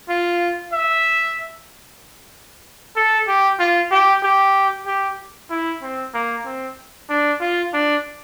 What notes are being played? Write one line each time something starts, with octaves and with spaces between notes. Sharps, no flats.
F4
E5
A4
G4
F4
G4
G4
G4
E4
C4
A#3
C4
D4
F4
D4